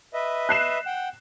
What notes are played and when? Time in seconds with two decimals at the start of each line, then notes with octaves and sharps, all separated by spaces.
0.14 B4 D#5 E5
0.49 F#6 C7 E7
0.86 F#5 G5